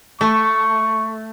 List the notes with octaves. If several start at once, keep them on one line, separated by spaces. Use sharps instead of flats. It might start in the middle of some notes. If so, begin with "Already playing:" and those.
A3 C#6